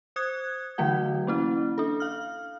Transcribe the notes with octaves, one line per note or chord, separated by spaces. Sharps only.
C5 D#6 F#6 G#6
D3 E3 F#3 A3 F#4 F#5
A#3 C#4 E4
D4 A4
F5 F6